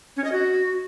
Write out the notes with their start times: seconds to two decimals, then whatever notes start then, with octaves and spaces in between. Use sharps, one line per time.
0.17 C#4
0.24 D#5
0.32 F#4